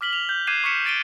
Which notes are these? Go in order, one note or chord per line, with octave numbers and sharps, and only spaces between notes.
D6 F6 B6 F#7 G7
F7
G6
D6 F#6 G#6 C7 D#7 E7
C#6 D6 F6 B6 C#7 E7
G6 A6 D7 D#7 G7